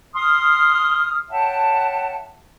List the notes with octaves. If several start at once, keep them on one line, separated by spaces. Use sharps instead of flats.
C6 D#6 F6
C#5 E5 F#5 G5 A5